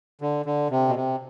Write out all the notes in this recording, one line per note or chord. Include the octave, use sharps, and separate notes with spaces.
D3
D3
C3
B2
C3